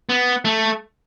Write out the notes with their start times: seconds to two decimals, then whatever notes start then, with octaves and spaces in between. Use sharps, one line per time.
0.09 B3
0.45 A3